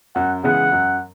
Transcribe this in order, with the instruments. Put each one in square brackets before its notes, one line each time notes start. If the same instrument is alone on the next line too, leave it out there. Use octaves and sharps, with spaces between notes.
[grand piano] F#2 [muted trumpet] F#5
[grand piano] C#3 E3 G#3 B3 [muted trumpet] F#5
[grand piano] F#2